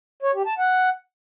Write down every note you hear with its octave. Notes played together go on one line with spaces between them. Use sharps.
C#5
G4
A5
F#5